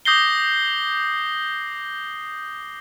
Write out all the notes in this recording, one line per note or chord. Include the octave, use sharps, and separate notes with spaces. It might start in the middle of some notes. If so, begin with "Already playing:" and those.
D6 D#6 G6 A#6 C7 G7